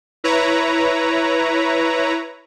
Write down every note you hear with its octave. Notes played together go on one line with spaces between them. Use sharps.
E4 B4 C#5 A#5